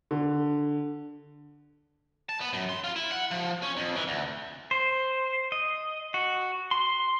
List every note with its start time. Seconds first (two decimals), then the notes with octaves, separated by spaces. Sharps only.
0.11 D3
2.29 A5
2.41 B3
2.53 F#2
2.69 C6
2.84 F4
2.96 E4
3.12 F#5
3.31 F3
3.63 C#4
3.77 F2
3.96 E3
4.08 D2
4.71 C5
5.52 D#5
6.14 F#4
6.71 C6